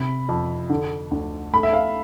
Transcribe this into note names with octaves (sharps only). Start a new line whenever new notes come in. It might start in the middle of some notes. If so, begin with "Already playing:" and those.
Already playing: C3 B5
F2
D3
D2
A3 B5
E5
F5